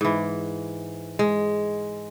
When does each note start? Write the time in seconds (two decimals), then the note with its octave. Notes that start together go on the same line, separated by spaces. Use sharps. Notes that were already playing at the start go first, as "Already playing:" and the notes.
0.01 G#2 E3
1.19 G#3